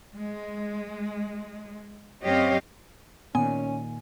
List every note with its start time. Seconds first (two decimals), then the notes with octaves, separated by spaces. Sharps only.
0.16 G#3
2.24 F#2 C4 G4 C#5 D#5 F5
3.35 A#2 D#3 B3 C#4 G#5